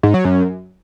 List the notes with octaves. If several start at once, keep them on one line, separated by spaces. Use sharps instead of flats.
G#2
F#3
F#2